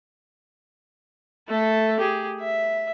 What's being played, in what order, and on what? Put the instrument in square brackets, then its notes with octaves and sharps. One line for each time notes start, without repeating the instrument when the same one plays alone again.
[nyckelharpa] A3 A4
G4 G#4
E5